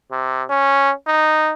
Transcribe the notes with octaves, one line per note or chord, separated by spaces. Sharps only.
C3
C#4
D#4